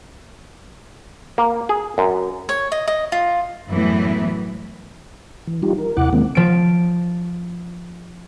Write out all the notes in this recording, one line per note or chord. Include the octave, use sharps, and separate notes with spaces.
A#3
G#4
F#2
C#5
D#5
D#5
F4
F#2 A2 E3 G3 B3 E4
E3
G3 D#4 F4 G4
A#4
D#2 C3 E4 F#5 D6 F#6
D#3 G#3 A#3 C4
F3 D7